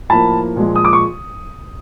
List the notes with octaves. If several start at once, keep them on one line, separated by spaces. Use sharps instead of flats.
A2 F3 A#3 A5 B5
A#2 F3 G#3
D#6
D6
C#6